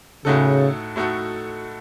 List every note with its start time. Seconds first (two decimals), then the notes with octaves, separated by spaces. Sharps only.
0.25 A2 C#3 A3 D#4 F#4 A4
0.96 A2 A3 D#4 F#4 A4